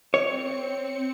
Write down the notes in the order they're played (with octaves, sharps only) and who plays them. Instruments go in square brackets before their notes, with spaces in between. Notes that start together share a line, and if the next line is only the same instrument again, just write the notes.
[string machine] C4 C#7 [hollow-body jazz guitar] C#5